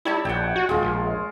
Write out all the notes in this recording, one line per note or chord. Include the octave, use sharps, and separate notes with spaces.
G3 E4 C#5 A5
A#1 F#5 G5
F#4
D#1 G#3 F4
A#1